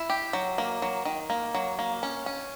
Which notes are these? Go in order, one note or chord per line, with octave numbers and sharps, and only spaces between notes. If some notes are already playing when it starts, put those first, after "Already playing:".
Already playing: E4
G4
F#3
A#3
F#3
D#3
A#3
F#3
A#3
C#4
C#4